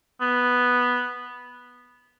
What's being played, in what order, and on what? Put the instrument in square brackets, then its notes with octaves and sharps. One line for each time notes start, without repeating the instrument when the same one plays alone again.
[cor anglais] B3